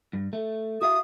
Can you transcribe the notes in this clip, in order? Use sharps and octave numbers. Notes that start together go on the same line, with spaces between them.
G2
A3
F#4 E5 F5 D#6